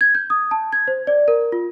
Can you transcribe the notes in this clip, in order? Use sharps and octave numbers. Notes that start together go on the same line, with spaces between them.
G#6
G6
D#6
A5
G#6
C5
D5
A#4
F4